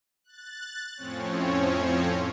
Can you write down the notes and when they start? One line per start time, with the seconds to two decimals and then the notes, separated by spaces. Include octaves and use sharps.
0.24 F#6 A6
0.96 F2 A2 F3 C4 C#4 C#5